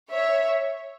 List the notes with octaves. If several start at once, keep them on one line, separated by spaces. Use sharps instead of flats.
C#5 E5